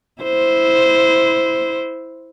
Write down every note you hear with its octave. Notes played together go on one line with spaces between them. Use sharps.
E4 C5